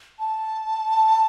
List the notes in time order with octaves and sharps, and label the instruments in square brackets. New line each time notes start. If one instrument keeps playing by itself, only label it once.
[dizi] A5